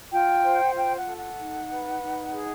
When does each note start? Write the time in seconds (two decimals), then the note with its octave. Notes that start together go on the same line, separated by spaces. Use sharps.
0.11 F4 G5
0.43 C5
0.63 F#5
0.75 F4 G5
0.96 F#5
1.07 A4
1.17 F#5
1.39 D#4
1.70 B4
2.02 D#4
2.33 G#4